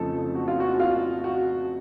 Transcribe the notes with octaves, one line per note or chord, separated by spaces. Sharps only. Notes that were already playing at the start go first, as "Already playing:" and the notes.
Already playing: F2 C#3 F3 A3 D#4 A4
F#4
F4
F#4
F4
F#4